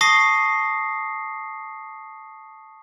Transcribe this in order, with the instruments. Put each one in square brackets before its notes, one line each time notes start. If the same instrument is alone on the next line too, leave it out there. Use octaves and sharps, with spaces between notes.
[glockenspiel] A5 C#6 D#6 A#6 C7